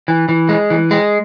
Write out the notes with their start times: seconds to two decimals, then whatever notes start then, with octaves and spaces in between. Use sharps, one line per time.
0.08 E3
0.29 E3
0.49 G#3
0.70 E3
0.91 G#3